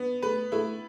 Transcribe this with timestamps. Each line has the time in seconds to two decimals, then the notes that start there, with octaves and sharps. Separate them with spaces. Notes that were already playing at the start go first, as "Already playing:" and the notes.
Already playing: B3
0.22 A3 B4
0.52 A3 E4